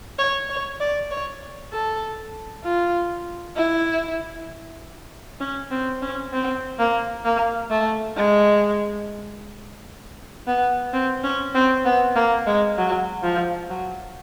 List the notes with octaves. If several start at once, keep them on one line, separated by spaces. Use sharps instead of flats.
C#5
C#5
D5
C#5
A4
F4
E4
C#4
C4
C#4
C4
A#3
A#3
A3
G#3
B3
C4
C#4
C4
B3
A#3
G#3
F#3
F3
F#3